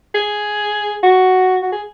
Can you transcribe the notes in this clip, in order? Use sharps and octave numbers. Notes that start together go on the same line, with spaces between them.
G#4
F#4
F#4
G#4